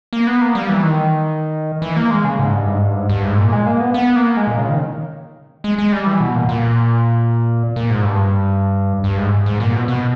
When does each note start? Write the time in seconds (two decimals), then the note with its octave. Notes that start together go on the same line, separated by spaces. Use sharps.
0.13 A#3
0.27 B3
0.41 A#3
0.55 G3
0.69 E3
0.83 D#3
1.82 E3
1.96 A#3
2.11 G#3
2.24 C#3
2.39 G#2
2.53 G2
2.67 G#2
2.81 G2
2.95 G#2
3.10 G2
3.24 G#2
3.38 A#2
3.52 G#3
3.66 A#3
3.80 B3
3.94 B3
4.16 A#3
4.37 G#3
4.47 A#2
4.58 C#3
4.69 D#3
5.64 G#3
5.78 G#3
5.92 G3
6.07 E3
6.20 B2
6.35 A#2
6.49 A#2
7.76 A#2
7.90 G#2
8.04 G2
9.04 G2
9.18 G#2
9.46 G#2
9.60 A#2
9.74 B2
9.88 B2